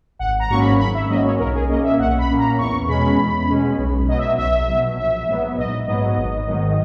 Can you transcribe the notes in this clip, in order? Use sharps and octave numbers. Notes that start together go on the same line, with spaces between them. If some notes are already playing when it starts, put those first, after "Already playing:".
G#1 F#5
A#5
G#2 F#3 A#3 C#4 C#6
B5
G#1 B5
E5
G#2 F#3 A#3 C#4 D#5
C#5
B1 A#4
G#4
A#2 A#3 C#4 D#5
E5
B1 F#5
B5
A#2 A#3 C#4
A#5
E2 C#6
B2 G#3 C#4 B5
E2
B2 G#3 C#4
B1
B2 F#3 D#5
E5
B1 E5
B2 F#3
A#1 E5
G#2 F#3 B3
A#1 D#5
G#2 F#3 B3 D#5
G#1
G#2 D#3 F#3